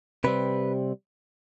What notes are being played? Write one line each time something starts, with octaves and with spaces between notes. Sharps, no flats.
C3 G3 C4 B4